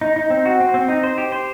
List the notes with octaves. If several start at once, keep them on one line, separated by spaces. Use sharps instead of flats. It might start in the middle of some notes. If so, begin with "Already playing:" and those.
D#4
D#4
C4
F#4
C4
C4
D#4
C5
G4
C5